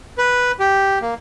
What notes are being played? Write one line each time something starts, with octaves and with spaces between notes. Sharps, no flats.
B4
G4
A#3